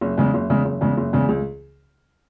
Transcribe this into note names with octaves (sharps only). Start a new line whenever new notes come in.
F#1
E2 C#3 G#3
F#1
E2 C#3 G#3
F#1
E2 C#3 G#3
F#1
E2 C#3 G#3
C#2